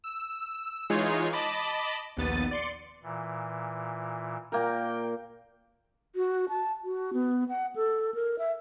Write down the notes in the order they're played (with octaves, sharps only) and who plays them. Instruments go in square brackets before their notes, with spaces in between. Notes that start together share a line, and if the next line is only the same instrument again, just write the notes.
[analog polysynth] E6
E3 G#3 D#4 F4 G#4 C#5
D#5 A5 B5 D6
A#1 D#2 B3 A6 D#7
D5 C6 C#7
[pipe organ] A#2 E3
[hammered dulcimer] A#2 A#3 A#4 [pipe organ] G5 G6
[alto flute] F#4
A5
F#4
B3
F#5
A4
A#4
E5